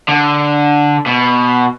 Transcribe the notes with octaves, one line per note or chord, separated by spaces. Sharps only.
D3
B2